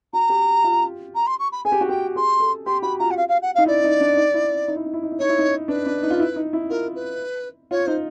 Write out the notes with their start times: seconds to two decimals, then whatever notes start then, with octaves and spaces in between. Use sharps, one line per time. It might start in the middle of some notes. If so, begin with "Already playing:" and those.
0.13 F#4 A#5
0.29 G4
0.64 F4
1.15 A#5
1.26 C6
1.39 C#6
1.52 B5
1.65 G#4 G#5
1.72 G4
1.81 F#4
1.89 G4 G5
2.16 G#4 C6
2.40 A4
2.66 G4 C6
2.82 F#4 B5
2.99 F4 A#5
3.10 F#5
3.17 F5
3.28 F5
3.42 F#5
3.55 D#4 F5
3.66 E4 D5
3.84 D#4
4.01 D4
4.17 D#4
4.34 E4
4.68 D#4
4.76 E4
4.86 D#4
4.94 E4
5.03 D#4
5.12 E4
5.19 D#4 C#5
5.29 E4
5.39 D#4
5.68 D4 B4
5.86 D4
6.03 D#4
6.10 F4
6.20 E4
6.36 D#4
6.53 E4
6.70 F4 A#4
6.95 B4
7.71 F4 C#5
7.86 D#4 C5